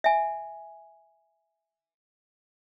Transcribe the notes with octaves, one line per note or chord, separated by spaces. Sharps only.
E5 G#5